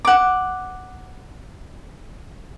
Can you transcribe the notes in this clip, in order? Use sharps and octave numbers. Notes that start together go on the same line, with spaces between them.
F#5 D6